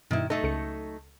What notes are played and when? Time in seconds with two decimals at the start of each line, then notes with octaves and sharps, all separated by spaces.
0.11 G2 B2 D#3 E4
0.30 F#3 A3 D#4 A4
0.43 C#2 A4 C#7